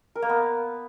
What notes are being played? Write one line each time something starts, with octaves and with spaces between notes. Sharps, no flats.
A#4
A#3
B3